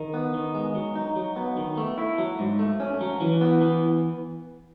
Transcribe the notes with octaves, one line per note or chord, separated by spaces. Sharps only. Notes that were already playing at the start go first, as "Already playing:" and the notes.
Already playing: D#3
B3
D#3
G#3
F#3
D#4
F#3
B3
D#3
A3
E4
F#3
G#2
A3
C#4
F#3
E3
B3
E3